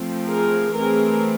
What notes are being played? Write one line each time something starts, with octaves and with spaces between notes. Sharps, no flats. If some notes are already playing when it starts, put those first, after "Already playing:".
Already playing: F3 A3 C4
G#4 A#4
E3 A3 C4 G#4 A#4